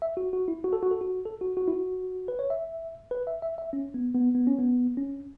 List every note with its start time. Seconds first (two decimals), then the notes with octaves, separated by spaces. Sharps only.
0.02 E5
0.17 F#4
0.33 F#4
0.48 E4
0.64 F#4
0.73 A4
0.83 F#4
0.91 A4
1.01 F#4
1.25 A4
1.41 F#4
1.57 F#4
1.68 E4
1.72 F#4
2.28 B4
2.39 C#5
2.50 E5
3.11 B4
3.27 E5
3.42 E5
3.58 E5
3.73 C#4
3.94 B3
4.14 B3
4.35 B3
4.47 C#4
4.59 B3
4.97 C#4